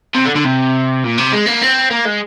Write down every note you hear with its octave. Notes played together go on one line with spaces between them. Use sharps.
C3
D3
D3
C3
A#2
C3
G#3
A#3
C4
A#3
G#3